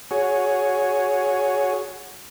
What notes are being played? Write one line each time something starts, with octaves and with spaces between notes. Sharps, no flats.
F#4 G#4 C#5